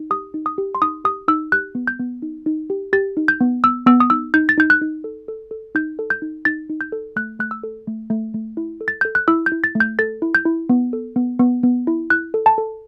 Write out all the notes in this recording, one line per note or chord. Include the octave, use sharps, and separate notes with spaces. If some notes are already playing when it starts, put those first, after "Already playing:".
Already playing: D#4
G4 D#6
D#4
D#6
G4
C6
D#4 D#6
G4 D#6
D#4 E6
G4 F#6
B3
G6
B3
D#4
D#4
G4
G4 A6
D#4
G6
B3
B3 E6
B3 E6
D#6
D#4 E6
D#4 G6
A6
D#4 G6
F#6
D#4
A4
A4
A4
D#4 G6
A4
G6
D#4
D#4 A6
D#4
G6
A4
A3 F#6
A3 F#6
E6
A4
A3
A3
A3
E4
A4
A6
A4 G6
F#6
E4 E6
G6
E4
A6
A3
G6
A4 A6
E4
G6
E4
B3
A4
B3
B3
B3
E4
E4 F#6
A4
A5
A4